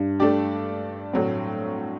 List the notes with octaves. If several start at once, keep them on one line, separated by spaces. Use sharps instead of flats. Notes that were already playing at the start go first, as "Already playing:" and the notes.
Already playing: G2
A3 D4 G4 D5
A2 F#3 C4